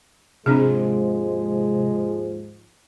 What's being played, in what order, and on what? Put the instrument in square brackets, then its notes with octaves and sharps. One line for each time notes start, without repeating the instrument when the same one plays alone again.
[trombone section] D#2 G#2 F3 [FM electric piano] C3 [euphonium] G#3 [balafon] C4 D4 G#4